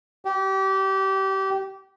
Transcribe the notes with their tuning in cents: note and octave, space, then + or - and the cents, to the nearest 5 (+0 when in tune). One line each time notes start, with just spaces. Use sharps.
G4 -25